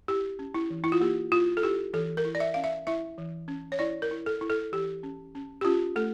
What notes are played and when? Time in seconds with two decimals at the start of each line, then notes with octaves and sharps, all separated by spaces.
0.08 E4 G4
0.39 C#4
0.54 E4
0.70 E3
0.84 E4
0.92 F4
1.00 A#3 G4
1.32 E4 F4
1.57 A4
1.63 E4 G4
1.93 E3 A4
2.17 A#4
2.25 E4
2.35 D5
2.40 E5
2.54 C#4 F5
2.64 E5
2.87 E4 E5
3.18 E3
3.48 C#4
3.72 C#5
3.79 E4 D5
4.02 A#4
4.11 E4
4.26 A4
4.41 E4
4.50 A4
4.72 E3 G4
5.03 C#4
5.35 C#4
5.61 G4
5.65 C#4 F4
5.96 A3 A4